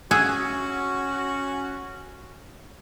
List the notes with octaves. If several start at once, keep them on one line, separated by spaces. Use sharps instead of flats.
C#4 F#4 G#4 E5 F#5